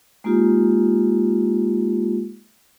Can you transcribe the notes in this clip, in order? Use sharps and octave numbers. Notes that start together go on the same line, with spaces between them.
G#3 A#3 D#4 F4 G4